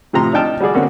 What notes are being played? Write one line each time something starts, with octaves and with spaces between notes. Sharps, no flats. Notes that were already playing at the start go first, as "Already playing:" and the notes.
A2 C3 F3 A#5 C6
D4 D#4 G5 A5 F6
G3 F#4 G#4 D5
D3 A#3 C4 C#4 F#4